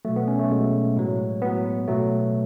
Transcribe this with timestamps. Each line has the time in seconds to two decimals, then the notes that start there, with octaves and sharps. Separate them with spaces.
0.05 B2 F#3 A3
0.16 B3
0.28 C#4
0.39 A3
0.50 B2 F#3 G#3
0.96 A2 F#3
1.42 A2 F#3 B3
1.88 B2 F#3 A3